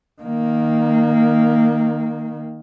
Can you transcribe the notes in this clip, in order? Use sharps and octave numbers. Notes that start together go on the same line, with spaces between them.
D#3 A#3